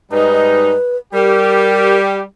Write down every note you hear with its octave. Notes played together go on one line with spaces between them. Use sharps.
G#2 G3 D#4 B4
G3 G4 A#4